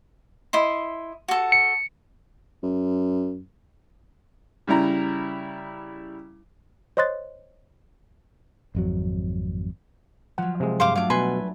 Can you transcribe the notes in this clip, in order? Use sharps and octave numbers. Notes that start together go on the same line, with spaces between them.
E4 D#5 C6
F#4 A4
C#7
F#2
C#3 G3 E4 A#5
C5 C#5 D#5 C6 F#6 A6
G#1 F2 F#3
F3 F#3 F#5
C3 G#3
G2 C5 F5 D6
F#3 A3 D4 F5 D6
B2 B4 G#5 C6